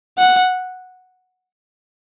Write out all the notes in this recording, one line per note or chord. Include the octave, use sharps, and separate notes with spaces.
F#5